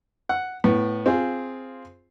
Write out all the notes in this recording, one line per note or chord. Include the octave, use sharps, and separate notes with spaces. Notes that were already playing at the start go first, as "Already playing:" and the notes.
F#5
A2 B3
C4 F4 G#4